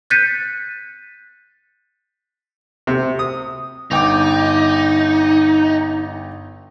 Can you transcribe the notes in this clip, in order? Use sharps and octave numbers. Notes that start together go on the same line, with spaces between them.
F#6 G6 A6 B6 C#7 D#7
C3
D#6
G1 D#4 G5 D6